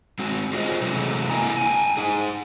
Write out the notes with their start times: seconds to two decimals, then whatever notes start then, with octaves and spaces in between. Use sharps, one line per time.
0.19 G#3 C4 F#4
0.52 F4 F#4 G#4 C5 D5 D#5
0.82 C3 E3 F#3 G#3 A3
1.30 A#3 E4 D#5 G5 G#5 A#5
1.57 G5 G#5
1.97 D#4 G#4